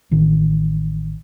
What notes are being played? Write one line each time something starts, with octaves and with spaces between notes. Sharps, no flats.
A1 D#3